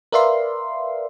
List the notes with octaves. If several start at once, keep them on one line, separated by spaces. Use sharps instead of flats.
A#4 B4 D5 E5 F5 C6